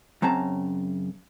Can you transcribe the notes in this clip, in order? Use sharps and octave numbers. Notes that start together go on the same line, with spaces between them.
F#2 C#3 C4 A5 A#5